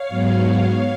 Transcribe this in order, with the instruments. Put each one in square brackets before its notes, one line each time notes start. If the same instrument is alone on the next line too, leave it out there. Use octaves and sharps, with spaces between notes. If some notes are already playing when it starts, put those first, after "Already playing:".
Already playing: [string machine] C#5 F5
G#2 F#3 B3